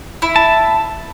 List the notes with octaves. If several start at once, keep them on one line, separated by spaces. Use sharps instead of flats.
E4
A5